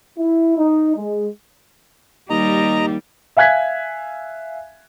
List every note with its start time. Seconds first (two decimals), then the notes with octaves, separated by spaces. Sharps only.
0.18 E4
0.58 D#4
0.96 G#3
2.30 D#2 G3 D#5 A#5
3.37 E5 F5 G#5 F#6 G#6 B6